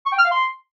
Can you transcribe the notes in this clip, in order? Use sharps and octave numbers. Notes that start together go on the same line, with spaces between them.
C#6
G5
F6
F5
C6